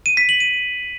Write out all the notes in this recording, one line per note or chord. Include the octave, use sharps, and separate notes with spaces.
D#7
B6
F#7
D#7